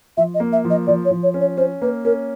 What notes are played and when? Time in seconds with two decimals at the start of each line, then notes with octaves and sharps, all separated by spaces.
0.17 F3 E5
0.34 D#5
0.40 A#3
0.52 E5
0.65 F3
0.70 D#5
0.87 F3 D5
1.05 C#5
1.11 F3
1.23 C#5
1.34 C#4
1.40 C#5
1.57 C#4 C5
1.82 A#3 B4
2.04 C#4 A#4